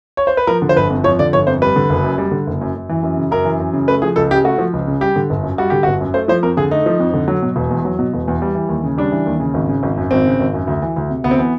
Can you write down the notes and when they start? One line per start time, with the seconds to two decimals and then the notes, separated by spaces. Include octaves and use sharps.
0.17 C#5
0.27 C5
0.37 B4
0.47 F3 A#4
0.62 D3
0.69 C5
0.76 G1 B4
0.90 F2
1.04 F3 C#5
1.19 D3 D5
1.33 G1 C#5
1.47 F2 C5
1.62 G3 B4
1.76 D3
1.90 F#1
2.04 F#2
2.18 G3
2.32 D3
2.47 F#1
2.61 F#2
2.75 F#2
2.89 E3
3.03 F#2
3.17 C#3
3.31 F#2 A#4
3.45 E3
3.60 F#2
3.73 C#3
3.88 A3 B4
4.02 F3 G#4
4.16 C#2 A4
4.31 C#3 G4
4.44 A3 F#4
4.58 F3
4.73 C#2
4.87 C#3
5.01 G3 G4
5.16 D3
5.30 G1
5.43 F#2
5.58 G3 F#4
5.70 D3 G4
5.83 G1 F#4
6.01 F#2
6.14 A3 C5
6.28 F3 C5
6.43 F2 A#4
6.57 D3 G#4
6.71 A3 D#4
6.86 F3
7.00 F2
7.14 D3
7.28 F#3
7.42 B2
7.56 E1
7.70 E2
7.85 F#3
7.99 B2
8.13 E1
8.28 E2
8.42 G3
8.55 E3
8.69 D#2
8.84 C#3
8.98 G3 D4
9.12 E3
9.26 D#2
9.40 C#3
9.54 G#1
9.69 C#3
9.83 G#1
9.97 F#2
10.11 G#1 C4
10.25 C#3
10.40 G#1
10.54 F#2
10.67 D2
10.82 E3
10.96 D2
11.10 C3
11.24 D2 B3
11.31 C4
11.38 E3 B3